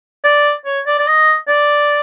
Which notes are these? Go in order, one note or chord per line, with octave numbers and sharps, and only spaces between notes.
D5
C#5
D5
D5
D#5
D5